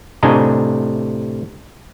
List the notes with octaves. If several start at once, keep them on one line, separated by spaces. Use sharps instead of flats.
A2 C3 D4 D#5 G#5 A#5